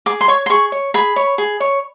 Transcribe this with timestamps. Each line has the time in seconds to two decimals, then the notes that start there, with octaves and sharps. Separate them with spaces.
0.06 G#4 D6
0.21 C6
0.28 C#5 C#6
0.46 C6
0.50 G#4 C#6
0.72 C#5
0.94 G#4 B5
1.16 C#5
1.38 G#4
1.60 C#5